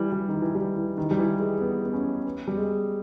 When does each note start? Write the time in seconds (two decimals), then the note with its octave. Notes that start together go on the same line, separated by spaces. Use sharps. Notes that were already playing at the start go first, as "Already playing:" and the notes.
Already playing: E3 G3
0.12 G3
0.29 D#3
0.42 E3
0.55 G3
0.76 E3
0.98 D#3
1.11 G3
1.19 E3
1.39 G#3
1.61 B3
1.85 B3
1.93 C#4
2.25 B3
2.48 G3
2.57 G#3